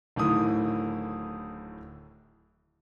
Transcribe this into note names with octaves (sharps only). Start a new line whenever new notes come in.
D1 A2 D#3 E4 D#6